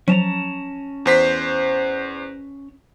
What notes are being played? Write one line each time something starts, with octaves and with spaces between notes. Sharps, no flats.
F3 F#3 C#4 A5 A#5
E2 C5 B6